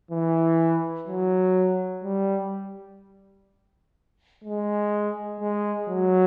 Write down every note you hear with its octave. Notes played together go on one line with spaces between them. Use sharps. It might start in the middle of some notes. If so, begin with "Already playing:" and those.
E3
F#3
G3
G#3
G#3
F#3